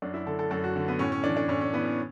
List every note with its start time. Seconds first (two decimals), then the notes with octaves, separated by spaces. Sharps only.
0.02 F#2 D4
0.14 E4
0.26 D3 A4
0.39 A4
0.51 F#2 A4
0.64 F#4
0.76 D3
0.88 B3
0.99 A2 C#4
1.12 C#4
1.24 E3 D4
1.37 D4
1.48 A2 C#4
1.61 C#4
1.73 E3 B3
1.85 C#4